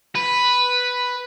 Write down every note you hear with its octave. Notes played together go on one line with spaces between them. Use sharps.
B4